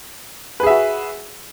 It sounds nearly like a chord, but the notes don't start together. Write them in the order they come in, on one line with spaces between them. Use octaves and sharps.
B4 G#4 E5 F#4